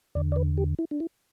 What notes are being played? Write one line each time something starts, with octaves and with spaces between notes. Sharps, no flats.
E2 D3 D5
D5
B4
G4
E4
D4
E4